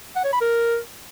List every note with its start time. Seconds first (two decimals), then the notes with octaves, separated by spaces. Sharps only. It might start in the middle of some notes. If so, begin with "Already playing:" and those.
0.16 F#5
0.24 C#5
0.33 B5
0.41 A#4